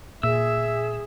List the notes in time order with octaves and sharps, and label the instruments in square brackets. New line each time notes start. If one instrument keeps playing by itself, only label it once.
[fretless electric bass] A#2 [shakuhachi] G#4 [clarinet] E5 [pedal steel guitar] E6